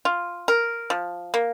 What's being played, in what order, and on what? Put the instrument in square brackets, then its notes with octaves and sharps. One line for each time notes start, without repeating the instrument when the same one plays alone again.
[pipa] F4
A#4
F3
A#3